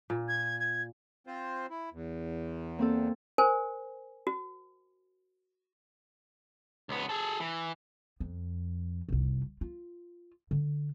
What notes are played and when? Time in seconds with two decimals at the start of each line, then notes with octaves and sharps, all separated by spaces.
0.10 A#2
0.28 G#6
0.59 G#6
1.27 C4 F4 C5
1.70 E4
1.93 E2
2.79 A#3 C4 A4
3.38 A#4 C5 G#5
4.27 F#4
6.89 C#2 B3
7.09 G#4 A4
7.40 E3
8.20 F2
9.09 F1 C2
9.61 F4
10.51 D3